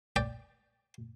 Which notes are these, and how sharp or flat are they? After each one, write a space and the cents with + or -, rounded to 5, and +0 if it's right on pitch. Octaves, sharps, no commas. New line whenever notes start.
D5 +0 G5 +0